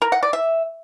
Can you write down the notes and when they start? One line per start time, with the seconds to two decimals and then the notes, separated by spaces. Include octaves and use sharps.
0.02 A#4
0.12 F#5
0.23 D5
0.33 E5